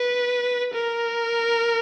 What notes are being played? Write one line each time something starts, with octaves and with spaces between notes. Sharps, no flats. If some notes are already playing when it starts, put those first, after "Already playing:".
Already playing: B4
A#4